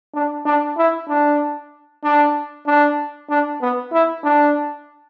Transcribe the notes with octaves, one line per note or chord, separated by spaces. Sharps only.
D4
D4
E4
D4
D4
D4
D4
B3
E4
D4